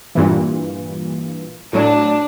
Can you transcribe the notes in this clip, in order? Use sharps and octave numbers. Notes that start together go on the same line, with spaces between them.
G2 A#2 E3
A2 F#3 D4